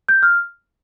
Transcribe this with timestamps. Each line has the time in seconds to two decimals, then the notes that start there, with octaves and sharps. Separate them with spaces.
0.09 G6
0.23 F6